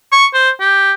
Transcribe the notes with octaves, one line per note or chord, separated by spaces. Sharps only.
C#6
C5
G4